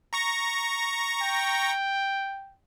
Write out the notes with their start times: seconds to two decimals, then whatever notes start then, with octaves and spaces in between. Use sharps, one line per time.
0.13 A#5 C#6 A#6
1.21 G5